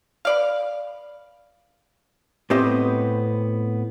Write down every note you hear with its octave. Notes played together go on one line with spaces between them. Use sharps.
B4 D5 F5
A2 B3 C4 G4 C5 D#5